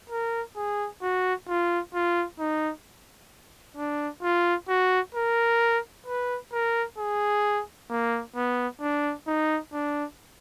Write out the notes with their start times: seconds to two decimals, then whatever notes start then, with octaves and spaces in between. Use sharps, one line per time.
0.10 A#4
0.56 G#4
1.02 F#4
1.48 F4
1.94 F4
2.39 D#4
3.77 D4
4.23 F4
4.68 F#4
5.14 A#4
6.06 B4
6.52 A#4
6.98 G#4
7.90 A#3
8.36 B3
8.81 D4
9.27 D#4
9.73 D4